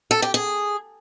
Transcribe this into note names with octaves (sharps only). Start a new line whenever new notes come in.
A4
G4
G#4